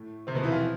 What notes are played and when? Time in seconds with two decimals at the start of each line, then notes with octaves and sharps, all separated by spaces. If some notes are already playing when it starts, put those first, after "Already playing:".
Already playing: A2 A3
0.27 C3 C4
0.35 B2 B3
0.43 E3 E4
0.52 F3 F4